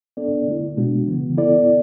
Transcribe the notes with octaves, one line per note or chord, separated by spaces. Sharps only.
B3 D4 A4 D5
D3 A3 E4
B2 G#3 B3 D4 F#4
C#3 E3 B3
B3 E4 A4 D5